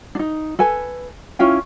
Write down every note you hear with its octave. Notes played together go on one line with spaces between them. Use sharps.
D4 D#4
A4 B4 G#5
C#4 E4 F4 G5